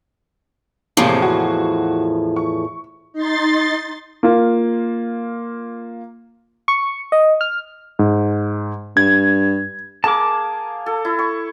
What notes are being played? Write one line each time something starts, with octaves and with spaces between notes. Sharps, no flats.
E2 A2 C3 F3 A#3
F#4
C#6
D#4 C6 A6
A#3 F4
C#6
D#5
F6
G#2
G2 G#6
A#3 G#4 A#4 A5 D6
A4
E4
C#6